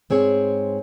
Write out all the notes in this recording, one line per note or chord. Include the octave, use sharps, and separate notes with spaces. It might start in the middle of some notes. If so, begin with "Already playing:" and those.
G#2 C4 G#4 C#5